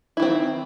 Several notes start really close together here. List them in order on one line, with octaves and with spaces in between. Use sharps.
E4 D#3 C4